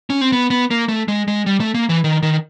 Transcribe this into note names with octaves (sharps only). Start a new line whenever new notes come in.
C#4
C4
B3
B3
A#3
A3
G#3
G#3
G3
A3
A#3
E3
D#3
D#3